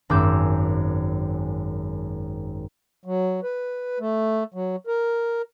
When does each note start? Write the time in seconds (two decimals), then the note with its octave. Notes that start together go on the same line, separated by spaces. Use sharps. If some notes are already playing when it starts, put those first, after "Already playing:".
0.10 G#1 F#2 D6 E6 G6 E7
3.06 F#3
3.43 B4
4.00 A3
4.54 F#3
4.87 A#4